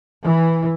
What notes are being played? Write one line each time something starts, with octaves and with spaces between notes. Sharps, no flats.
E3